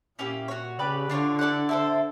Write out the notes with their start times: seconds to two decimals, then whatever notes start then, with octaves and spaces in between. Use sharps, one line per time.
0.19 A#2 A#3 C#4 E4 G4
0.48 F#4 A4 C#5
0.79 C#3 G4 B4 D5
1.09 D3 D4 F4 A#4 C#5
1.39 E4 A4 D5 F#5
1.69 E4 A4 C5